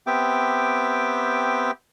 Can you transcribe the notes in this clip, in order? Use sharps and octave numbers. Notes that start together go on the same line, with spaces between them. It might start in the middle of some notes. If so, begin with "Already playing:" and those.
B3 C4 G4 E5 G5 D6